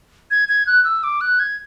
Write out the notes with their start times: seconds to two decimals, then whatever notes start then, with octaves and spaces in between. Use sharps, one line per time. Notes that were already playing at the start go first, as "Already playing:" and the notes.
0.31 G#6
0.49 G#6
0.67 F#6
0.84 E6
1.04 D6
1.21 F#6
1.39 G#6